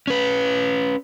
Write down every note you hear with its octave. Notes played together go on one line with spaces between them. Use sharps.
C#4 B4